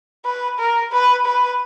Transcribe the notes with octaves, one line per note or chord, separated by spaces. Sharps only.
B4
A#4
B4
B4